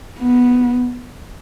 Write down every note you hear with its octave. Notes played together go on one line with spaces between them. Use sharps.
B3